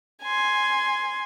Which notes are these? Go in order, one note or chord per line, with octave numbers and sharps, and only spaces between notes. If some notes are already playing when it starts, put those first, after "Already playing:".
G#5 C6